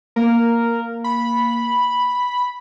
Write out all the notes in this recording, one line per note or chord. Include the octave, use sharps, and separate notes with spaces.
A#3 A#4
B5